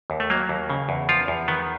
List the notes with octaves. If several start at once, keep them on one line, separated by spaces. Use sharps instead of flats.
D#2
A3
F#3 A#3
D#2
C#3
E2
F3 F4
E2
D#3 B3